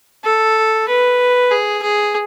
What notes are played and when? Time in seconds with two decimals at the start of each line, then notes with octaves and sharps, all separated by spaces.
0.24 A4
0.88 B4
1.51 G#4
1.82 G#4